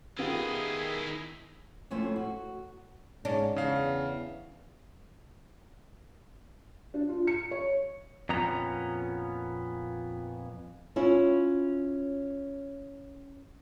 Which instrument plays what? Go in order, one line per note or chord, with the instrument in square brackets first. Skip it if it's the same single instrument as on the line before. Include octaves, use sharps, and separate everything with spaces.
[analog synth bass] D#3 [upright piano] B3 F4 G4 [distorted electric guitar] E4 D#5 [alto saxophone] G#4
[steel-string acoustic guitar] F2 A2 A3 C#4 F4 C5
F#4
[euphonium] G#2 [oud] C#4 D4
[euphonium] E2 [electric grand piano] C#3 F5
[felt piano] D4
F4
C#7
C#5
[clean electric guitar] F2 A#2 B3 C#4 A#5
[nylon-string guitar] C#4 E4 F4 C#5